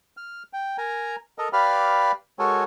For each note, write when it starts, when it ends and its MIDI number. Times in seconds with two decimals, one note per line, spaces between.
0.17 0.43 89
0.53 0.77 79
0.78 1.16 70
0.78 1.16 80
0.78 1.16 82
1.38 1.49 69
1.38 1.49 70
1.38 1.49 75
1.53 2.12 67
1.53 2.12 71
1.53 2.12 74
1.53 2.12 77
1.53 2.12 83
1.53 2.12 89
2.39 2.64 56
2.39 2.64 66
2.39 2.64 69
2.39 2.64 70
2.39 2.64 73
2.39 2.64 80